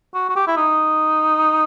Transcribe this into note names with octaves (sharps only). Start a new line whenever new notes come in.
F#4
F#4
G4
E4
D#4